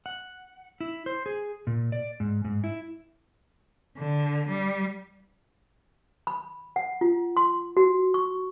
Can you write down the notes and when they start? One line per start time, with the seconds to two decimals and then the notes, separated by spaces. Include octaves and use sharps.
0.06 F#5
0.81 E4
1.06 C5
1.26 G#4
1.67 A#2
1.92 D5
2.20 G#2
2.45 G#2
2.64 E4
3.98 D3
4.49 G3
6.27 B5
6.76 F#5
7.01 F4
7.37 C6
7.77 F#4
8.14 C#6